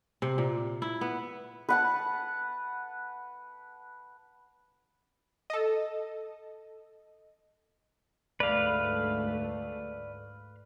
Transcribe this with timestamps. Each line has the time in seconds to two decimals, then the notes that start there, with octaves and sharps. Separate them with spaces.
0.22 C3
0.38 A#2
0.82 E4
1.01 B3
1.69 B4 F#5 A5
5.50 A4 D#5
8.40 D2 G#2 A3 B4 D5 F5